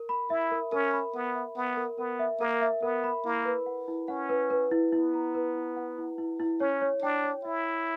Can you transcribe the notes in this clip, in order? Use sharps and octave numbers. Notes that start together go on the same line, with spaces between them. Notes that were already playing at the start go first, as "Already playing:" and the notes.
Already playing: A#4
B5
E4 E5
A#4
C#4 A#4
B5
B3 A#4
E5
B3 E5
A#4
B3 A#4
E5
A#3 A#4
E5
B3 A#4
B5
A#3 E4
B4
F#5
E4
C#4 F#5
B4
B4
E4
B3 E4
A#5
B4
E4
F#5
E4
E4
E4
C#4 C#5
C#5
D4 G5
C#5
E4 E5
E5